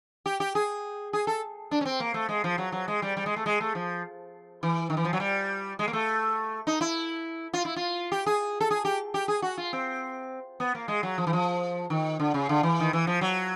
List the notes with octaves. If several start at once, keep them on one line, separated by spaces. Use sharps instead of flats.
G4
G4
G#4
G#4
A4
D4
C#4
C4
A#3
A3
G#3
F3
F#3
F#3
G#3
G3
G3
G#3
A3
G#3
A3
F3
E3
D#3
E3
F3
F#3
G3
G#3
A#3
A3
D#4
E4
F4
E4
F4
G4
G#4
A4
G#4
G4
G4
G#4
F#4
F4
C4
B3
A#3
G#3
F#3
F3
E3
F3
D#3
D3
C#3
D3
E3
D#3
E3
F3
F#3